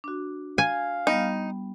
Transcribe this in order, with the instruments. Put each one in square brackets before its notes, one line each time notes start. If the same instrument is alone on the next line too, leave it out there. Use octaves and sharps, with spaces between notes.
[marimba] D4 F#4
[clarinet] F5 [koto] G#5 [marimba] G#6
[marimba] G3 B3 [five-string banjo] D#4